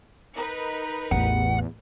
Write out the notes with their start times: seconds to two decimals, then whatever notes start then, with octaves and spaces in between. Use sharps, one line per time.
0.35 D#4 A#4 B4
1.12 A1 E2 F#5